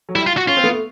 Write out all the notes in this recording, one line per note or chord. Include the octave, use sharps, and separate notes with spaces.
F#3
G3 E4
F4
F#4
C#4 F4
C4
B3
A3